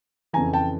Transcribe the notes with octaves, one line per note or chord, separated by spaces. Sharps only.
F2 C#3 E3 G#5 A#5
G5 A5